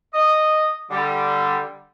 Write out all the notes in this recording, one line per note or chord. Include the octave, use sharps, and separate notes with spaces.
D#5
D3 G3